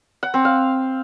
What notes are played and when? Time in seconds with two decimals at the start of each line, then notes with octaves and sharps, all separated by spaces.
0.23 F#5
0.34 C4
0.45 F5